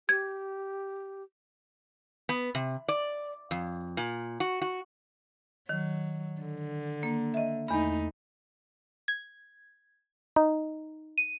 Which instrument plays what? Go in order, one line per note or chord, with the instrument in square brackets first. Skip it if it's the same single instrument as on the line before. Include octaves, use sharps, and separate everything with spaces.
[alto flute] G4 [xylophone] G#6
[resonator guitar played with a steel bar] B3
C3
D5
F2
A#2
F#4
F#4
[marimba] D#3 [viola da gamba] F#3
[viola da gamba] D3
[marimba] A#3
D#5 E5
[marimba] E2 B5 [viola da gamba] A3 D#4
[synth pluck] G#6
D#4
D#7